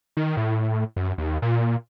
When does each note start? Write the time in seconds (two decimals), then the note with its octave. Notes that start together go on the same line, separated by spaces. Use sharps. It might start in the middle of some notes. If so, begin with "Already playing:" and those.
0.17 D#3
0.37 A2
0.96 F#2
1.18 D#2
1.42 A#2